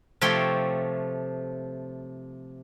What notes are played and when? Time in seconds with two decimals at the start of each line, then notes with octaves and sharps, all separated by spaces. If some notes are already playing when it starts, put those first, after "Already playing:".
0.21 C3 F3 A3 C#5 G5 C6